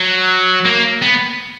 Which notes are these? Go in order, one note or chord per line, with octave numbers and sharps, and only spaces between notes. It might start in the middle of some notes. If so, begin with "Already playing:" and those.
Already playing: F#3
A#3
B3